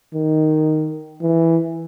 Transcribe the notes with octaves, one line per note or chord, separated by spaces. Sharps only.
D#3
E3